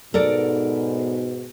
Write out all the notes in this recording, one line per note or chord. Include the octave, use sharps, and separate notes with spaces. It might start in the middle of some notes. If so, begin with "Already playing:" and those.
G#2 B2 A4 A#4 D5